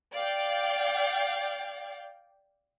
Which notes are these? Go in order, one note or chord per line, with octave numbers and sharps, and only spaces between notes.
D5 F5 G5